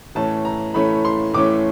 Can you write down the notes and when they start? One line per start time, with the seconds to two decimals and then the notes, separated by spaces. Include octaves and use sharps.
0.15 A2 E3 A3 C#4 A5
0.45 A#5
0.74 A2 E3 A3 C#4 B5
1.05 C6
1.33 A2 E3 A3 C#4 D6